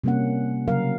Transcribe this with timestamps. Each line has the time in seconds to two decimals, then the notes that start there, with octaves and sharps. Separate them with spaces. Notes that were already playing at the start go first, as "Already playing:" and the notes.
0.04 C3 G3 A#3 C#4 F#5
0.68 C#3 F#3 A#4 F5